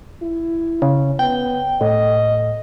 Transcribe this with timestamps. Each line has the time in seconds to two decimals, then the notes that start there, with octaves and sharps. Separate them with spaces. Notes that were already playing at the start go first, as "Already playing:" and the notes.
0.22 E4
0.82 C#3
1.19 B3 G5
1.81 A2 D#5